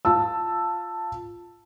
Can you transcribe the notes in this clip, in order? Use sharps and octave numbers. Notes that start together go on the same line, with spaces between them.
F4 A5 E6